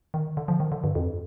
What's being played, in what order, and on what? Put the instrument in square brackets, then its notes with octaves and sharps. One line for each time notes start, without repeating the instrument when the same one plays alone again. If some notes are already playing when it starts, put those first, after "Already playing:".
[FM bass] D#3
D3
F3
D#3
D3
G2
F2